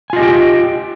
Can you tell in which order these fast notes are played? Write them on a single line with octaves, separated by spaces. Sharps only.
G#5 F4 D#5 G4 G5